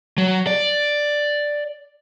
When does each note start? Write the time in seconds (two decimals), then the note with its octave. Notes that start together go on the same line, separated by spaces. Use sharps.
0.18 F#3
0.47 D5